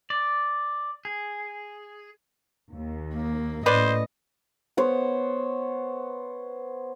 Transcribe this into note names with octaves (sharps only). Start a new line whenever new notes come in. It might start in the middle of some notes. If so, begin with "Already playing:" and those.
D5
G#4
D#2
A#3
A2 C#4 B4 C5 D5 D#5
B3 C5 C#5